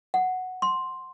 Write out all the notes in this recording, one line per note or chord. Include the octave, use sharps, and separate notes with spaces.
F#5
C6